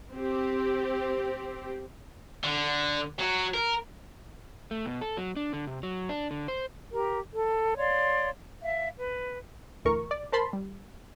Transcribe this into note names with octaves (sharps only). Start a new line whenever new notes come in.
C4 G4
D3
F#3 F#4
A#4
A3
B2
A4
F#3
D4
D3
C3
F#3
D4
D3
C5
G4 A#4
A4
C#5 D5 F5 C6
E5 F5
B4
D2 A2 E3 A#4 C#6
D5
A#4 C5 A5 B5 C6
G3